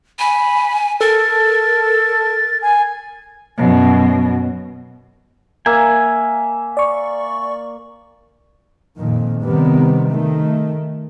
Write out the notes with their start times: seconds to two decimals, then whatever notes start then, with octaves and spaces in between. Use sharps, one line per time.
0.19 G#5 B5
1.01 A4 A#4 A6
2.61 G#5
3.57 F#2 B2
5.66 A#3 E5 G#5
6.77 D5 C#6
8.97 F2 A#2 D#3
9.43 C3 D#3 G3 B3
10.08 D#3 A3